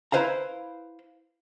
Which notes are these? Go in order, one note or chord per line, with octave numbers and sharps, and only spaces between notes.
E4 B4 C5 F5 A#5